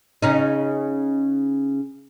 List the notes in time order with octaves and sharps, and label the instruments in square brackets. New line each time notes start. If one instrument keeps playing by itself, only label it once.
[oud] C#3 C#4 D#4